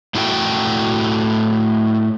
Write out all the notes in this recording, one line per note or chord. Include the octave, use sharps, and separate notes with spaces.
A2 D4 E4 F#4 A4 G5